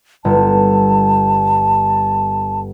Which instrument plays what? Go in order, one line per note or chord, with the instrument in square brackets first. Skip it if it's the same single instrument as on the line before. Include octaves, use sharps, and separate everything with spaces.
[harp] G1 [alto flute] A5